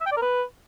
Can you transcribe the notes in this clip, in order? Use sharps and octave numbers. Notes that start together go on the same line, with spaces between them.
E5
G5
D5
A#4
B4